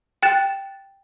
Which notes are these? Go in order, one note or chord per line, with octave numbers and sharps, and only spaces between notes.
G5 F#6 A6 E7